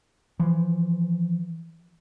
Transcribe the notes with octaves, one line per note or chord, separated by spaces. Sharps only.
E3 F3